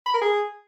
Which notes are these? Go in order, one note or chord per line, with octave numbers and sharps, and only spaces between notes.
B5
A#4
G#4